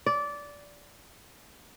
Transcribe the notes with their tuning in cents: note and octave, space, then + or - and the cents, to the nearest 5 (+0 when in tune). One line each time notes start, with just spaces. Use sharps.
D5 -15